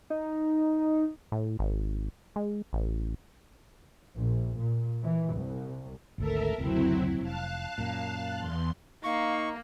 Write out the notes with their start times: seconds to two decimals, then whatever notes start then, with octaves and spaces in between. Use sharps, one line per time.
0.10 D#4
1.32 A2
1.59 G#1
2.36 G#3
2.73 A1
4.15 A#1
4.58 A#2
5.03 E3
5.35 C2
6.18 G#1 D2 A4 A#4 E5
6.58 F#1 D2 C3 F#3 C4 E4
7.21 F1 F5 A5 F#6
7.78 F#2 A#2
8.38 E2 C6
9.04 A#3 D#4 F5 C#6